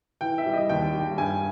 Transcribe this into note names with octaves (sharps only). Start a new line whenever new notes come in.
E3 G5
E5
G3
D#5
D#2 G5
G3
G2 G#5